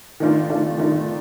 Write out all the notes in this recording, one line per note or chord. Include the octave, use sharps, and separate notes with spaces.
D#3 A3 D4 F4
D#3 A3 D4 F4
D#3 A3 D4 F4